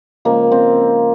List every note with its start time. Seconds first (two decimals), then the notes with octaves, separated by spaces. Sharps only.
0.25 C#3 F3 G#3 A#3
0.52 C4